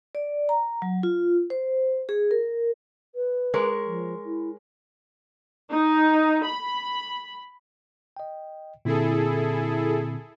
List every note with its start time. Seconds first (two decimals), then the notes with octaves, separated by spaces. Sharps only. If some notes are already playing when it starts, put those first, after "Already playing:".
0.15 D5
0.49 A#5
0.82 F#3
1.03 F4
1.50 C5
2.09 G#4
2.31 A#4
3.15 B4
3.54 G#3 A#4 C#5
3.86 F3
4.25 E4
5.70 D#4
6.44 B5
8.17 D#5 G5
8.85 A#2 D3 C4 E4 G#4 A4